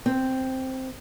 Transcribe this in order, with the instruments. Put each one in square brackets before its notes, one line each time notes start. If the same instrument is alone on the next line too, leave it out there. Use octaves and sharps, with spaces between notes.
[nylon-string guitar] C4